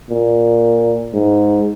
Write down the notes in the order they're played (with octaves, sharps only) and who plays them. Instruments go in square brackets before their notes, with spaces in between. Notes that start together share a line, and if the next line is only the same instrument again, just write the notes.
[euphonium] A#2
G#2